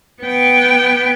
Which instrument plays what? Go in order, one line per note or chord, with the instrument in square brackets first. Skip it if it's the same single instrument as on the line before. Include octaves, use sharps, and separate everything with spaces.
[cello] B3 G5